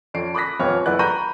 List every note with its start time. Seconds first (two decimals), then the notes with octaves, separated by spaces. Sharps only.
0.14 F2 C#4 D5 C7 D7
0.34 B5 D6 D#6 F#6 A#6 B6
0.59 D#1 F2 B3 C4 C#5 F6
0.86 F#1 E4 B4 D5 F#5 F#6
0.99 A#5 B5 C#6 G6 A#6 D#7